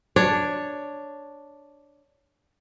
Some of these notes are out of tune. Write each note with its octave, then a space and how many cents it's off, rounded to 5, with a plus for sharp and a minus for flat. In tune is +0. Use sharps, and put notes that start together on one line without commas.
D4 +0 C#5 +0